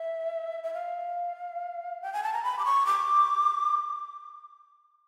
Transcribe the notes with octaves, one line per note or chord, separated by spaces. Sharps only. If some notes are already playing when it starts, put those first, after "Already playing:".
Already playing: E5
E5
F5
G5
G#5
A5
A#5
B5
D6
C#6
D6